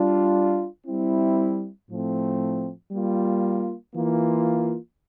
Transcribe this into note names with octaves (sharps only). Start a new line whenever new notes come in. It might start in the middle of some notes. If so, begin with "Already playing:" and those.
Already playing: G3 D4 F4
G3 C4 E4
A2 F3 A3 C4
G3 A#3 F4
E3 A#3 F4